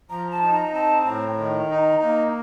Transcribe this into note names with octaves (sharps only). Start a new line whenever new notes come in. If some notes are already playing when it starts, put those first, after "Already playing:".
F3 A#5
A5
D#4
A#5
C4 A5
A2 A#5
D#3
D#4
A#3